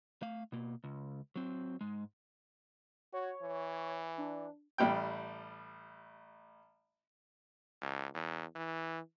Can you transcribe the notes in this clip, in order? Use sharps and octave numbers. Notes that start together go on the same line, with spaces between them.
A3 F5
B2 A#3
C#2
F#3 C4
G#2 G#3
F#4 C#5
E3
D4
A1 G3 G5
C#2
E2
E3